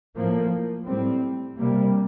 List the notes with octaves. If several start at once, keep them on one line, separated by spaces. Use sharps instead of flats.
A2 F3 A#3
A2 G3 C4
C3 G3 A#3